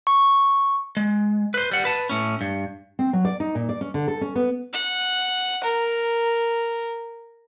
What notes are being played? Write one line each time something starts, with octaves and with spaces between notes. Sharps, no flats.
C#6
G#3
B4 C5
G3 F#5
B4 A5
A2 C#4
G2
C4
F#3
D5
D#4
A#2
D5
C#4
D3
A4
C#4
B3
F#5
A#4